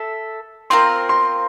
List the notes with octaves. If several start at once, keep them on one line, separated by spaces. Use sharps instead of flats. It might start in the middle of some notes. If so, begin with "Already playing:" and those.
Already playing: A4 E5
C4 F4 A#4 C6
C6